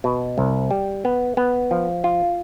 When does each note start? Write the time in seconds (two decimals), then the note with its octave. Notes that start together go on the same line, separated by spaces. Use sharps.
0.04 B2
0.38 C2
0.71 G3
1.05 B3
1.37 B3
1.71 F3
2.04 F4